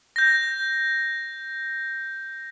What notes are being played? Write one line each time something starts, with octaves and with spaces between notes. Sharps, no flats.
G6 A#6